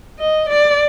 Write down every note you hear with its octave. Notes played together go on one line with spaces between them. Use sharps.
D#5
D5